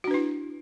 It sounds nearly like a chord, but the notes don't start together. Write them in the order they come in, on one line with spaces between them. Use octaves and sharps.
F#4 D4 B4 E4